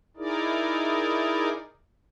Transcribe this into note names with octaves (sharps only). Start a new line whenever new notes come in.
D#4 E4 G#4 A#4 D5